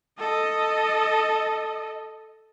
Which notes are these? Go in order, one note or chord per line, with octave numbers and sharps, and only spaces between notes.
A4 D#5